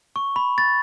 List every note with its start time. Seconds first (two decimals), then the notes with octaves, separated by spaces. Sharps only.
0.16 C#6
0.36 B5
0.58 A6